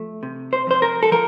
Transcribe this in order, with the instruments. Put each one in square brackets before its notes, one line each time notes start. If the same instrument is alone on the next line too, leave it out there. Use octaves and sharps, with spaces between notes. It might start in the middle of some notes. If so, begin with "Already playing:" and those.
Already playing: [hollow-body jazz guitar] F3 A3
C3
C5
F2 C5
A#4
A4
F3 A#4